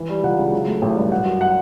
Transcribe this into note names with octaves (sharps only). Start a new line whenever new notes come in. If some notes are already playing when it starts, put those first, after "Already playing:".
Already playing: E3
G3
C#2 F#5
C#3
F#3
A3
A1
G2
F#3 F#5
F#2
F#5